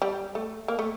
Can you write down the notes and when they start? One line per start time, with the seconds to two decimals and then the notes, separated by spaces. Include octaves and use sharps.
0.02 G3
0.35 A3
0.68 A#3
0.79 A3